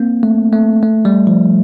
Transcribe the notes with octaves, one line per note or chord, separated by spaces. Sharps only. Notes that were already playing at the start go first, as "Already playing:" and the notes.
Already playing: A#3 C4
A3
A3
A3
G3
F3